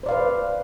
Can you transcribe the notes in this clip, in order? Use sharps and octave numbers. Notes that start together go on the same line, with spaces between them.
B4 C5 D5 F5